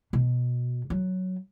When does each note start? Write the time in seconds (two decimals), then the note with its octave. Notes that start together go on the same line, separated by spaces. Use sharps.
0.13 B2
0.90 F#3